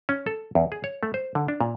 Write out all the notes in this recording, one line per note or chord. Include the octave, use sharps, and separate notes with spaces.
C#4
A4
E2
G#4
C#5
A3
C5
D3
D4
A#2